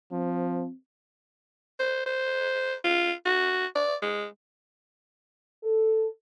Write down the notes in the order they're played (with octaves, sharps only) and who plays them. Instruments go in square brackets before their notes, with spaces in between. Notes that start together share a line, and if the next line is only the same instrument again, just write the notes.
[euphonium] F3 [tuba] C4
[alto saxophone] C5
C5
F4
F#4
D5
G#3
[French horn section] A4